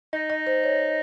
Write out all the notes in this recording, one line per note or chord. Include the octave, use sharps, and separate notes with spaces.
D#4 D#5
D#5
C5
C#5